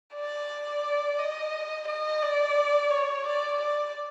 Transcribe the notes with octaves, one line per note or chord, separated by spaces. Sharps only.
D5
D#5
D#5
D5
C#5
D5
D5